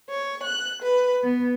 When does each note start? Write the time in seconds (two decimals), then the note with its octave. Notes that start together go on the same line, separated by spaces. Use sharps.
0.10 C#5
0.44 F#6
0.84 B4
1.24 B3